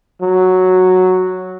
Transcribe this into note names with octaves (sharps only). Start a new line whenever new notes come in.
F#3